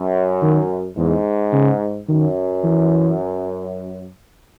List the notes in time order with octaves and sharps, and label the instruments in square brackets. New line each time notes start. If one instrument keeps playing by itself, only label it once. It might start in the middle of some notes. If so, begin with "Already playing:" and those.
Already playing: [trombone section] F#2
[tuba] D#3
[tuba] E2 [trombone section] G#2
[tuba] C#3
[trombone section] F#2 [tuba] D#3
[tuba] E3